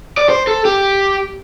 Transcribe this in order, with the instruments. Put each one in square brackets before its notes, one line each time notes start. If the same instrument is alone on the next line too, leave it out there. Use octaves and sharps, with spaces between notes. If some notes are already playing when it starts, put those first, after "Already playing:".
[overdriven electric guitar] D5
C5
A4
G4